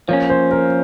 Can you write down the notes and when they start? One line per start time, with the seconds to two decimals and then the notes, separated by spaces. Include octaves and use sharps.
0.08 F3 A#3 C#4 C#5
0.30 C5
0.51 A#4